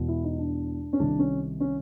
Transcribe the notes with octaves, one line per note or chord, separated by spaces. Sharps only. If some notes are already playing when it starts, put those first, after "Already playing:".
Already playing: E1 E2 B2
E4
D#4
D4
C#4
C2 C3 D#3 D4
C#4
C#4